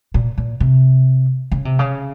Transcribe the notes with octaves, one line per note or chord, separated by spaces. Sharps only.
A#2
A#2
C3
C#3
C3
C#3